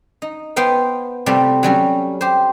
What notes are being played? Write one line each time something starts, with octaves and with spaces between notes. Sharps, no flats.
D#4
B3 C5 F5 G5
C3 G3 A3 F4
F#3 G3 C#4
G4 C5